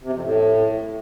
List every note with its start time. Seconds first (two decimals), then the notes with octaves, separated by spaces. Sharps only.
0.04 C3
0.13 F2
0.22 A2